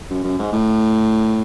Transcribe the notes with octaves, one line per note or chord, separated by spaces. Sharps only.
F#2
F#2
G#2
A2